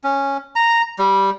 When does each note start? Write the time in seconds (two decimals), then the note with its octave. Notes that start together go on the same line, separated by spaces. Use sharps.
0.04 C#4
0.56 A#5
0.99 G3